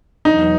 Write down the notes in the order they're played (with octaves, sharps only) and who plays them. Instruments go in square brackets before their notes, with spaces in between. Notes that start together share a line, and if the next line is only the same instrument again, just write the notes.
[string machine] E2 B2 F#3 B3 [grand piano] D#4